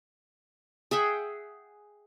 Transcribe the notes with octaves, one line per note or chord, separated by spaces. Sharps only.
G#4 E5 F#5 G5